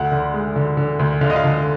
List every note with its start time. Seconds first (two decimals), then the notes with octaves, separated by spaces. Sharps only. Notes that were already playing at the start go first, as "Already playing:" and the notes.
Already playing: D2 F#5
0.12 D3
0.34 G#3
0.56 D3
0.77 D3
0.99 D2
1.21 D3 F5
1.30 D#5
1.36 F5
1.44 D3